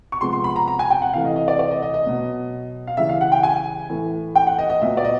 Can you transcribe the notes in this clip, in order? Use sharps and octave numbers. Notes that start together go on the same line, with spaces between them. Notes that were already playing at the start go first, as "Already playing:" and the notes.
C#6
C3 F3 G#3 B3 C6
C6
B5
A#5
A#5
G#5
G5
F#5
C3 E3 A3 F5
D#5
D#5
D5
D5
D#5
D#5
D#5
B2 F#3 B3
F5
C#3 E3 G3 E5
F5
F#5
G5
G#5
A2 E3 A3
G5
F#5
D#5
D#5
A#2 F#3 B3 E5
D5
D#5